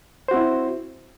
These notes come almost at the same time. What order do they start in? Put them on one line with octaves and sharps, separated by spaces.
C5 F#4 C4 E4